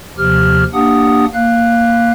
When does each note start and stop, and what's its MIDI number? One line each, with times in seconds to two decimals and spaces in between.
0.18 0.64 39
0.18 0.64 48
0.18 0.64 53
0.18 0.64 67
0.18 0.64 89
0.74 1.26 58
0.74 1.26 62
0.74 1.26 67
0.74 1.26 78
0.74 1.26 87
1.34 2.12 58
1.34 2.12 77
1.34 2.12 90